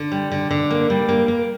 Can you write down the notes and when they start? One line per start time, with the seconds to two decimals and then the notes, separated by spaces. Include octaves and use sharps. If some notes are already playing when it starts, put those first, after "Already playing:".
Already playing: D3
0.12 G3
0.32 D3
0.51 D3
0.71 A#3
0.90 G3
1.09 A#3
1.28 A#3